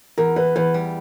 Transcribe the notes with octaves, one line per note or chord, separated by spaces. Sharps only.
E2 A#4
E3 B4
E2 B4
G3